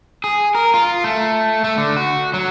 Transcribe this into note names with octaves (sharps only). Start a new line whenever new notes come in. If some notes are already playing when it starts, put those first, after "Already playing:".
G#4
A#4
F4
A3
A3
D3
F#4
F#3